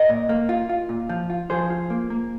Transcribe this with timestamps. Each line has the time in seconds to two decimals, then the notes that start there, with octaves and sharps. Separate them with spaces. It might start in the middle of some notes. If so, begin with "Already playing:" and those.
Already playing: A#4 D#5
0.09 A#2
0.29 A#3
0.49 F4
0.69 F4
0.89 A#2
1.09 F3
1.30 F4
1.50 F3 G#4 C5
1.70 F4
1.90 A#3
2.10 A#3